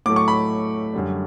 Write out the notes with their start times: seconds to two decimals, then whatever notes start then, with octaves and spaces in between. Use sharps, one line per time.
0.06 A2 F#3 A3 D6
0.16 C#6
0.28 B5
0.94 F#2 D3 G3